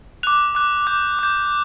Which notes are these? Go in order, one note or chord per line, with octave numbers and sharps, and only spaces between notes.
D6 F#6 F7
D6 F#6
D6 G6
D6 G6